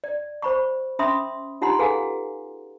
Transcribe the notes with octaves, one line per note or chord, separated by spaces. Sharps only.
D5
C5 B5 C#6
C#4 E5 B5 C6 D#6
D#4 F4 G4 F#5 A#5 C6
G#4 A4 B4 F5 F#5 G#5